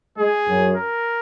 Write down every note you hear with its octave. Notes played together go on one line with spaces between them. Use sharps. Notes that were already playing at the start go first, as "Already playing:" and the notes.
G#3 G#4
F#2
A#4